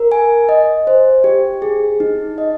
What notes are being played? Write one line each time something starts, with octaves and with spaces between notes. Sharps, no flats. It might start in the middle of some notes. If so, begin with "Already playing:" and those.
Already playing: A#4
G#5
D#5
C5
G4
G#4
D#4
D#5